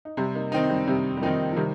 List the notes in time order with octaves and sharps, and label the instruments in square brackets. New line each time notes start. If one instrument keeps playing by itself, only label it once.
[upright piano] D#4
[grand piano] C3 [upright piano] G3 C4
[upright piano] A#3 D#4
[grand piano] D#3 C4 D#4
[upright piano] G3 C4
[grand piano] C3 [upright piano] G3 C4
[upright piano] G3
[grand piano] D#3 C4 D#4 [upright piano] F3 A#3
[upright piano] F3
[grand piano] C3 [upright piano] D#3 G3